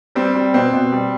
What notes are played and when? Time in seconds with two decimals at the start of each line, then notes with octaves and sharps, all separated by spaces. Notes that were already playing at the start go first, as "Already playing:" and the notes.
0.15 G3 C4
0.35 G3
0.54 B2 C4
0.73 B2
0.92 G3